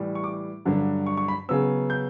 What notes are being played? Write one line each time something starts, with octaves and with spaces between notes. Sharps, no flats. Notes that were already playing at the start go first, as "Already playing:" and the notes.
Already playing: A2 E3 G3
C#6
D6
G2 D3 F#3
C#6
C#6
B5
C#3 F#3 B3 E6
G6